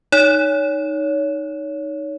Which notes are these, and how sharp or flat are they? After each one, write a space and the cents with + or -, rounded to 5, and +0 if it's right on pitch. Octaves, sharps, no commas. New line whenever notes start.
D#4 +0 C#5 +25